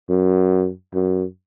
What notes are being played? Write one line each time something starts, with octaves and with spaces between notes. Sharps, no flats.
F#2
F#2